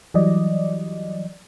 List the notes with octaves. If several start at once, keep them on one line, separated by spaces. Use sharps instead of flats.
E3 F#3 G3 D5 D#5